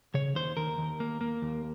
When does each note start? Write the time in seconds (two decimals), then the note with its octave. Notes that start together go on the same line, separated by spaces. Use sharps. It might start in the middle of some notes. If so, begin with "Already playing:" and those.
0.14 C#3 C#5
0.35 D#2 C5
0.57 D#2 A#4
0.78 D#2
1.00 A#3
1.21 A#3
1.42 D#2